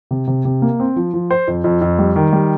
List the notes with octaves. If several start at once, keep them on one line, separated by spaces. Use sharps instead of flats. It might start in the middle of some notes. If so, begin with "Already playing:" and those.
C3
C3
C3
A#3
C4
F3
F3
C5
F2
F2
F2
G3
D#3
G3